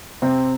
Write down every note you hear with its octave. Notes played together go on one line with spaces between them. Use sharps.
C3 C4